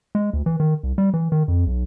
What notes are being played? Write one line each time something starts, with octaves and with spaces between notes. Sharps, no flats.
G#3
D2
E3
D#3
C2
G3
E3
D#3
F2
B1